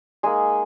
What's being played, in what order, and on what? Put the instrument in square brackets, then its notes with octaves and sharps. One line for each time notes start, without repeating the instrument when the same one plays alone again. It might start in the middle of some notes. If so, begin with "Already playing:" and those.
[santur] G#3 A#3 D#4 G#4